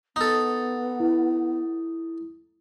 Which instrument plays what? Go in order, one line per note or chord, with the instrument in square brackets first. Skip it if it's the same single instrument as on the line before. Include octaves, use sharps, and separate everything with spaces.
[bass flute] B3 [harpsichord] D#4 A4
[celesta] E4